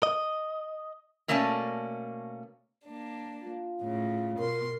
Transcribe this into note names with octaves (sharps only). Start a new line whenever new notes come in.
D#5
B2 A3 A#3 C#4 D5 A5
A#3 D4
F4
A2 C#3
B2 A#4 C6